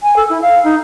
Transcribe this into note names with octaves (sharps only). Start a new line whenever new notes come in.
G#5
A4
E4
F5
D#4